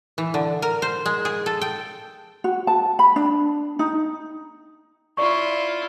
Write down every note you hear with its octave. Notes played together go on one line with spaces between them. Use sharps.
E3
D3
A#4
C5
G#3
G#4
A4
G5
F#4
A5
B5
D4
D#4
E4 F4 D5 C#6